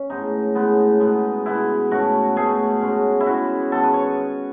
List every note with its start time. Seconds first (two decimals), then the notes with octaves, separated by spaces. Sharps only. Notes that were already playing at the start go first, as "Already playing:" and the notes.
Already playing: C#4
0.10 A2 G#3 B3 D#4
0.55 A2 G#3 B3
1.00 B2 G#3 B3
1.46 B2 G#3 B3 E4
1.91 B2 A3 C#4 F#4
2.36 B2 A3 C#4 G#4
2.81 B2 G#3 C#4
3.20 E4
3.26 B2 G#3 C#4 F#4
3.72 D#3 G#3 B3 A4
3.83 B4
3.94 C#5